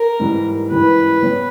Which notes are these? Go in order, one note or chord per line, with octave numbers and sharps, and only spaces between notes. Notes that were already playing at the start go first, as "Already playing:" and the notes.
Already playing: A#4
G#2 E3 G3
G#2 E3 G3 B4
G3 B3 G4 C#5